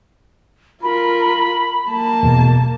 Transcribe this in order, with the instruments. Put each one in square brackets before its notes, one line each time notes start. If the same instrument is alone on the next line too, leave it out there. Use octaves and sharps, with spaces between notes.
[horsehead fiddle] F4 A#4 [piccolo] B5
[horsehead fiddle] A#3 A5
[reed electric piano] E2 B2